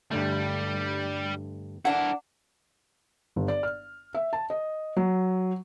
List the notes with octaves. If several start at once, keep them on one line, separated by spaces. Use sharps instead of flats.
G2 D3 G3 A3
D4 E4 A#4 F#5
G1
D5
F6
E5
A5
D#5
F#3